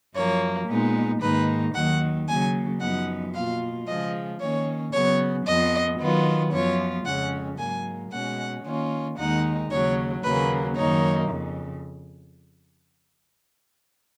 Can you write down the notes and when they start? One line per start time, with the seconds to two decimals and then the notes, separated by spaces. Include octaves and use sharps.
0.15 F#2 F3 A#3 C#5
0.68 A#2 G#3 B3 D#4
1.21 G#2 D#3 A#3 D#4 B4
1.74 D#2 D#3 F#3 F#5
2.28 C#3 F#3 A#3 G#5
2.80 F#2 F3 B3 D#4 F#5
3.34 B2 A#3 F4 F5
3.87 C#3 F3 G#3 D#5
4.40 D#3 A#3 C#4 C#5
4.93 C#3 F#3 B3 C#5
5.46 F2 F3 B3 D#5
5.99 D#3 F#3 B3 F4
6.52 F#2 F3 B3 F4 C#5
7.05 F2 C#3 G#3 C#4 F#5
7.58 G#2 F#3 A#3 G#5
8.11 B2 G#3 C#4 F#5
8.64 D#3 A#3 C#4 F4
9.17 D#2 D#3 G#3 D#4 F#5
9.70 D#2 C#3 F#3 C#5
10.24 D#2 C#3 F#3 A#3 B4
10.76 F#2 D#3 A#3 D#4 C#5
11.29 F2 C#3